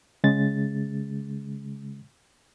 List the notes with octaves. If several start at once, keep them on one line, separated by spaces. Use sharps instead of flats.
C#3 G#3 A6